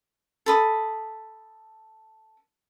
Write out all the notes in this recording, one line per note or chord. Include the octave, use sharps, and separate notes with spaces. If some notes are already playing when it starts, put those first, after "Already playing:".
A4 B5 D#6